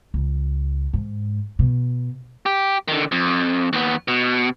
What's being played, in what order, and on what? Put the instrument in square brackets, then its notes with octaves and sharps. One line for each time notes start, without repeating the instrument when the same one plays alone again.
[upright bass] C#2
G#2
B2
[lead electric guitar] G4
D3 D#3
F2
D#2 B3
B2